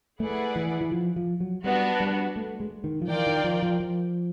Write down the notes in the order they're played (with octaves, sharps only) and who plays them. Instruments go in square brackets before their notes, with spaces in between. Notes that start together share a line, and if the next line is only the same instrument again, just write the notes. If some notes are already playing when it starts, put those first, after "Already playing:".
[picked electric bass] A3 [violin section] E4 G#4 B4 D5 F#5
[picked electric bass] E3
E3
F3
F3
F#3
[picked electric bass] G3 [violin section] B3 D4 F#4
[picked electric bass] G3
A3
G#3
D#3
F3
[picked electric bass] E3 [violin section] F4 A#4 D5 G5
[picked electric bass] D#3
F3
F3
F3